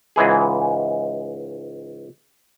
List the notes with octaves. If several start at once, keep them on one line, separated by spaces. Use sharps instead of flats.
C#2 G#2 E3 G#4